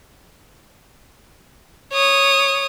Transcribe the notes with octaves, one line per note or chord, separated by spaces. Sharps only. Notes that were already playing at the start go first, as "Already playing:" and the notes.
C#5 D#6